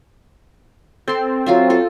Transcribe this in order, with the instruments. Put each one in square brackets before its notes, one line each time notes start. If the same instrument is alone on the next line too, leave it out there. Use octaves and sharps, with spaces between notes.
[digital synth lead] C4 [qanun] A4 C6
[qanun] F#3 F4 E5
F4 A4